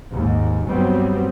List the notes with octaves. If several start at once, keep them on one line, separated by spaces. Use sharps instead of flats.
D#2 G#2
G2 F#3 G3 B3 C4